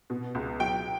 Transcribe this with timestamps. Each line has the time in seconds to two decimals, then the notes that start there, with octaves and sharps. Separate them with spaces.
0.10 B2
0.35 C#2
0.60 F#3 G5